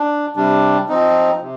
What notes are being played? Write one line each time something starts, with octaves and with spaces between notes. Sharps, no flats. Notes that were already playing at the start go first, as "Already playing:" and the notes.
Already playing: D4
C3 G3 D4
F3 C4 D#4
C3